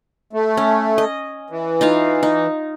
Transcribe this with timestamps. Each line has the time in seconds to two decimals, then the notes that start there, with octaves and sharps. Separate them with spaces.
0.33 A3
0.57 C#4
0.98 D#5
1.50 E3
1.81 D#4 F4 F5
2.23 D#4